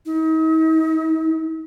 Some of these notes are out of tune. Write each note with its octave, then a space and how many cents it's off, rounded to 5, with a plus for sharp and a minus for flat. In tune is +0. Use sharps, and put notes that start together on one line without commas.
D#4 +45